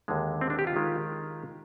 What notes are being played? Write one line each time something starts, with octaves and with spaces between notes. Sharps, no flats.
D#2 D3 G#3
C4
D4
G4
F4
D#3 G#3